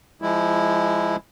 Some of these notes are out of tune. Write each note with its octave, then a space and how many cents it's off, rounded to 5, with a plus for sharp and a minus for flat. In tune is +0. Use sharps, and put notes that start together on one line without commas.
F3 -25 G#3 -15 E4 +0